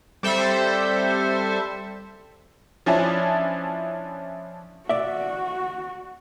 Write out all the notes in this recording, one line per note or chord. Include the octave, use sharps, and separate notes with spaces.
G3 C4 A4 C5 E5
F3 C#4 D4 E4
F#4 D5 E5